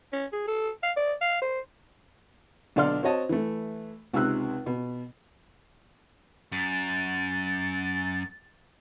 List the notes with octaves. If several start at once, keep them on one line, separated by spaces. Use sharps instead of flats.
C#4
G#4
A4
F5
D5
F5
C5
B1 D3 A4 D5 C6 F6
C4 F#4 C#5 D#5 A5
E3 A3
C#2 C3 D#4 E6 F#6
B2
F#2 A6